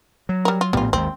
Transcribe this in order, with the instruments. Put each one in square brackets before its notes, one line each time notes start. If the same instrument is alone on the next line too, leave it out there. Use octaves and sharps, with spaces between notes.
[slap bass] F#3
[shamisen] G3 A#4
F4
[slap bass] A#1 A2 B3 [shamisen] G3 F4
[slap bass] G#1 D#2 [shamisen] C4